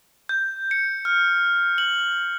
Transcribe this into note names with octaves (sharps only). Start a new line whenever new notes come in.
G6
C#7
F6
F#7